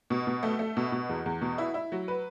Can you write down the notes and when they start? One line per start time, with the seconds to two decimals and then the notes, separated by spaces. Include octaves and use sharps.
0.10 B2
0.27 B2
0.43 A3
0.59 A3
0.77 B2
0.92 B2
1.09 E2
1.26 E2
1.41 B2
1.58 E4
1.74 E4
1.92 F#3
2.08 B4